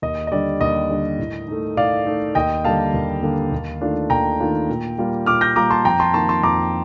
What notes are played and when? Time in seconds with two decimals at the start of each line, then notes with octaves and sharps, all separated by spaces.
0.02 D#2 D#5
0.27 D#5
0.31 D3 G3 D4 D5
0.61 D#2 D#5
0.90 D3 G3 D4
1.18 A2
1.48 A3 D#4
1.77 A2 D5 F5
2.06 A3 D#4
2.35 D#2 D#5 G5
2.64 D3 G3 A#3 F5 A5
2.94 D#2
3.23 D3 G3 A#3
3.52 D#2
3.81 D#3 A3 D4 F4
4.10 D#2 G5 A#5
4.40 D#3 A3 D4 F4
4.69 A#2
4.98 G3 A#3 F4
5.26 A#2 D6 F6
5.41 G6 A#6
5.56 G3 A#3 F4 A#5 D6
5.70 A5 C6
5.85 F2 G5 A#5
6.00 A5 C6
6.14 D#3 A#3 D#4 A5 C6
6.29 A5 C6
6.43 F2 A#5 D6